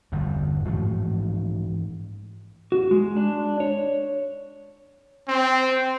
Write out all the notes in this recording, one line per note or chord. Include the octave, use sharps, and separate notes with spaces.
G1 E2 G2
G#2 E3 F3 A3
F#4
G#3
D4
C#5
C4